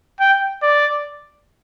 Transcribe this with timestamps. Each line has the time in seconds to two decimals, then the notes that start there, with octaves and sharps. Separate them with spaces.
0.20 G5
0.62 D5